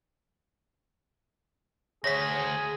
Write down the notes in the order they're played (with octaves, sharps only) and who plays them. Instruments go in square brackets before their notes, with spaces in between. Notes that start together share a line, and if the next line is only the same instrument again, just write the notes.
[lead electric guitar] D2 [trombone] G#4 [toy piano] C#5 E5 [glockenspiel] A#6 B6